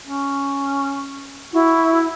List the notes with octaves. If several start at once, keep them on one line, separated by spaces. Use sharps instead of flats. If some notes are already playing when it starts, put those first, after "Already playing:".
C#4
E4 F#4